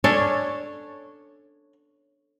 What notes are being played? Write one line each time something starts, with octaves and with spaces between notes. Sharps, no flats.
C#4 D4 A4 C#5